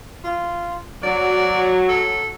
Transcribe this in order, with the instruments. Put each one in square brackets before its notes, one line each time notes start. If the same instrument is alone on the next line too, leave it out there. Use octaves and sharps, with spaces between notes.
[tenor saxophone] F4
[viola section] F#3 [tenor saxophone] D5
[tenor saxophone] A4